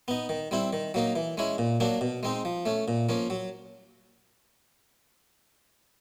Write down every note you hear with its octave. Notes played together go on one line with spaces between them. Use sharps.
B3 D#4
D#3
G3 C4 E4
D#3
F#3 A#3 D#4
E3
G#3 C#4 E4
A#2
F#3 A#3 D4
B2
G#3 C4 D#4
F3
A3 C#4
A#2
F3 A#3 C#4
F#3